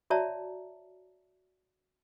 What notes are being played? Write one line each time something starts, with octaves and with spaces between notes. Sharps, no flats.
F#4 C#5 D5 E5 A5 A#5